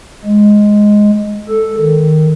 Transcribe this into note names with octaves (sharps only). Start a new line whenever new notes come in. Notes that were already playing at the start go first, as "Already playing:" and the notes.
G#3
A4
D#3